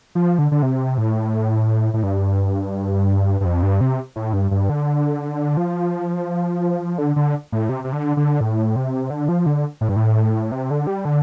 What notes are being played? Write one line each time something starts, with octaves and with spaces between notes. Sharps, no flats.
F3
D3
D3
C3
A2
A2
G2
G2
F2
G2
C3
A2
G2
G2
D3
F3
D3
D3
A2
C3
C3
D3
D3
A2
C3
D3
F3
D3
A2
G2
A2
C3
D3
G3
D3